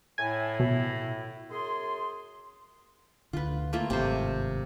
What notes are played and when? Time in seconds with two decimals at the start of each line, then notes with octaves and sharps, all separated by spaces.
0.18 A2 E4 G#5
0.60 B2
1.49 F#2 G#4 C6
3.33 D2 D3 F4 B4
3.73 A3 A#3 F4
3.90 G1 G#2 C3 D#3 C5